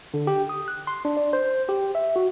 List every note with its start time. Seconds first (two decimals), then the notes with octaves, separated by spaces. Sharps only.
0.14 D3
0.27 G4
0.49 D#6
0.68 F#6
0.87 C6
1.05 D4
1.17 D5
1.33 C5
1.69 G4
1.95 E5
2.16 F#4